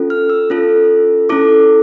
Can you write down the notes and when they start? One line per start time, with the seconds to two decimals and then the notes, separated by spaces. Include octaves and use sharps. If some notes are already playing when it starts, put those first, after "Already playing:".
Already playing: C#4 F4 A4
0.10 F6
0.30 E6
0.50 C#4 F4 A4
1.29 C#4 E4 A4 D6